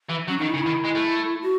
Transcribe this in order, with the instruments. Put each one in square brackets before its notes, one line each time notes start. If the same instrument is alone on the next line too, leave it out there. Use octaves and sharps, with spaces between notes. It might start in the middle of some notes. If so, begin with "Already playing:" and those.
[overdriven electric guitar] E3
[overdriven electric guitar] F#3 [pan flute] C#4
[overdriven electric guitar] D#3 [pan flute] D#4
[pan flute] E4
[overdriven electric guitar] C#3
[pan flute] E4
[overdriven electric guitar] D#3
G#3
A3
[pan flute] F#4